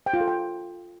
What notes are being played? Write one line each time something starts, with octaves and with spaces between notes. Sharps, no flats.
G5
F4
A4
G5